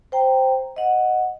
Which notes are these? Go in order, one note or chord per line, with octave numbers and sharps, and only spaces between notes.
C5 G5 A#5
D#5 F#5